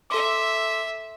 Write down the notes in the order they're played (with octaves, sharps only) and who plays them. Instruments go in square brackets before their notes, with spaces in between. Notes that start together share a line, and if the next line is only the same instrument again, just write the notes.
[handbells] A4 C6 D6 [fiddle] E5